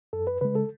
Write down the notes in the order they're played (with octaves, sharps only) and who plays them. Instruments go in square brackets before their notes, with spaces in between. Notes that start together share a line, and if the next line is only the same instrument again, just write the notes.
[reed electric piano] F#2 A4
B4
C#3 G#3 B4
A4